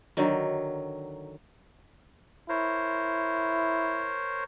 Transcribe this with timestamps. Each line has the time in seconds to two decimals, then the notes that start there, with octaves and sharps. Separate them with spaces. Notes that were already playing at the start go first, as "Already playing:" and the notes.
0.17 D3 D#3 F#3
2.49 E4 A#4 C5 C#5